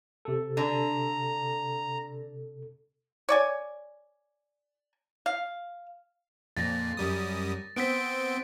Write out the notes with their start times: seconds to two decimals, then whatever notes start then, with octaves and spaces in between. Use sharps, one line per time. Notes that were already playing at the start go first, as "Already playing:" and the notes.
0.25 C3 A4
0.57 D3 A#5
3.29 C#5 D5 G#5
5.26 F5
6.57 F2 A#2 A6 A#6
6.97 F#2 G3 D#6
7.76 B3 C4 C5 B6 D7